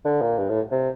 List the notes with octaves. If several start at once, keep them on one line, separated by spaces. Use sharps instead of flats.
D3
A#2
G2
A2
C3